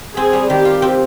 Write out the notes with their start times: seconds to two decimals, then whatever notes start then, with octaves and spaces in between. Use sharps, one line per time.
0.16 C4 G#4
0.33 G3
0.50 D#3 G4
0.65 F4
0.82 C4